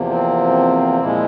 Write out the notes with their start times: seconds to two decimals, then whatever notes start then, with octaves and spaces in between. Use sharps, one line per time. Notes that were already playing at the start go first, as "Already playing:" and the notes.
Already playing: E2 C3 F3 A#3
0.11 C4
1.00 A#2 F3 G#3 E4